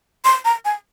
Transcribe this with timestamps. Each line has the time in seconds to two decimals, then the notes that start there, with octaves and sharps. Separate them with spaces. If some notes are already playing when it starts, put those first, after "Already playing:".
0.25 C6
0.45 A#5
0.65 G#5